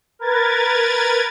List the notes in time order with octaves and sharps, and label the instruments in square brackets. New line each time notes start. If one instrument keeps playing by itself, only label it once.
[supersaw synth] A#4 B4 G#6 A6